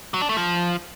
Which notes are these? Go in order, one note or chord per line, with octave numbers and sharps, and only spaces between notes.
F#3
D4
A3
F3